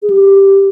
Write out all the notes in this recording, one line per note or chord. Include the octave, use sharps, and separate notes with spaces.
G#4
G4